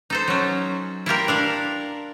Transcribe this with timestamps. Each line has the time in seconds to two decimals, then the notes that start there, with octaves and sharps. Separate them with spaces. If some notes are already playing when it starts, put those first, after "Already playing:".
0.10 D#4 A4 C5
0.28 F#3 C#4
1.06 E4 F4 G4 A#4
1.28 D4 A#4 F5